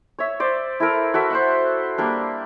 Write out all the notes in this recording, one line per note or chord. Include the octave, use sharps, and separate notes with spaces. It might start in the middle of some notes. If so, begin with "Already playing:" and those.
C#5 E5
C5 D5
E4 A4 A#4
F#4 A4 E5
C5 E5 F#5
G3 A#3 D4